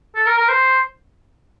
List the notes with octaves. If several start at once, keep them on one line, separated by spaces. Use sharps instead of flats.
A4
A#4
A#4
C5